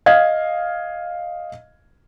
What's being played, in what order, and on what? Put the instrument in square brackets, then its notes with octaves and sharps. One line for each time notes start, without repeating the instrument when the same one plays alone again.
[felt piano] D#5 F5 G#6